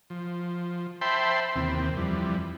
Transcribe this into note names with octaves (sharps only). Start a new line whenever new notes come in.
F3
C5 E5 G5 A5 B5 C6
D#2 C3 E3 C4
F2 E3 G3